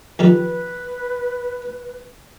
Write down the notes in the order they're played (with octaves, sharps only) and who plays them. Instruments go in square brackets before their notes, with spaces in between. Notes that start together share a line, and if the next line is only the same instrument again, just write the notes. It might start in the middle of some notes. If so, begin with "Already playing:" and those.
[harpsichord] F2 D#3 G3 [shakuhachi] B4